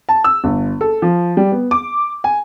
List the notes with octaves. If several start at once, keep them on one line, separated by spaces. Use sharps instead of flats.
A5
E6
G1
A4
F3
G3
B3
D6
G#5